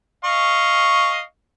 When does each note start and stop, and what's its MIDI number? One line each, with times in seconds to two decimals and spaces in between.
0.24 1.21 75
0.24 1.21 77
0.24 1.21 85